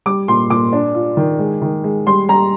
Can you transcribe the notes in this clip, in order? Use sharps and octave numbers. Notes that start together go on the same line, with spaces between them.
G3 D6
A#2 C6
A#2 D6
D4
F4
D#3
G#3
D#3
G#3
G3 C6
G3 A#5